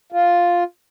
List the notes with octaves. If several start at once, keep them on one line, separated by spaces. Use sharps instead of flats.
F4